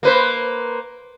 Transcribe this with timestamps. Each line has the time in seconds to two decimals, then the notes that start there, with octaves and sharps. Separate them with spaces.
0.03 A#3 B4 C5